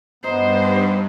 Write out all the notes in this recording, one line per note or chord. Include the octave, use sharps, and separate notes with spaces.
G2 B3 D#4 C5